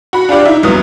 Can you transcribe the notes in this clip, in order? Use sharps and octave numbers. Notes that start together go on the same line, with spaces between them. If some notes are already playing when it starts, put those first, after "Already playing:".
F#4 B5
D4 F4 G4 D5
D#4 E4 E5
F1 C2 G2 F#3 B3 D#6